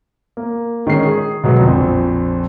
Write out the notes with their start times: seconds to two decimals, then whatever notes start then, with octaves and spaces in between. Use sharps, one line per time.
0.37 A#3
0.87 D#3 G#3 C#4 C7
1.05 G#4
1.44 B2 F#3 G#3 B3
1.60 A#1 F2